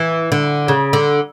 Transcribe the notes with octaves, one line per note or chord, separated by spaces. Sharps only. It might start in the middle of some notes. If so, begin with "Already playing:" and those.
Already playing: E3
D3
C#3
D3